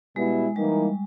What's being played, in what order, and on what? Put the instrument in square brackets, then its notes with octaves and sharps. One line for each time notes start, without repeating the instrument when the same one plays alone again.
[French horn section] B2 G3 B3 E4 [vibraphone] G#3
[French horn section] E3 A#3 D#4 [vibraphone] G3